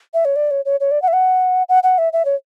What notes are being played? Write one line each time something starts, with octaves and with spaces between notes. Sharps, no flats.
E5
C#5
D5
C#5
C#5
C#5
D5
F#5
E5
F#5
F#5
F#5
E5
E5
C#5